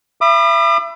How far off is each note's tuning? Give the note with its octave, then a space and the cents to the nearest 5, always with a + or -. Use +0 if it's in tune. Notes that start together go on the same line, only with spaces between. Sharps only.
E5 +30 B5 -5 D6 +45